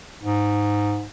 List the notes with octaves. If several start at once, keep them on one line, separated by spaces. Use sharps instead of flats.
G#2